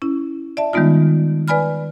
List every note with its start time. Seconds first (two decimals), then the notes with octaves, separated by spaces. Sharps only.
0.02 C#4 E4
0.57 D5 E5 A5
0.73 D#3 G3 G#3 B3 D#4 F4
1.48 B4 D5 G#5 B5 F6